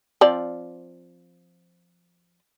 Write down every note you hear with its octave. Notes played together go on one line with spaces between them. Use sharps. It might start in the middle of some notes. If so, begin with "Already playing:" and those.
F3 C4 D5